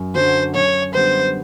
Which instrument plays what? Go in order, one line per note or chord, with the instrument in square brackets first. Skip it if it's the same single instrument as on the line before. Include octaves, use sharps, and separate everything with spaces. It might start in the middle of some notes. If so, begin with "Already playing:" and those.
Already playing: [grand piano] F#2
[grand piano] D3 F#3 [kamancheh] C5
[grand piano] F#2 [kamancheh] C#5
[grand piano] D3 G3 B3 [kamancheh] C5